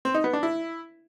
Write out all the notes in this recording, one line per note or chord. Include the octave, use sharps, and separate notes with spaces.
C4
D#4
B3
D4
E4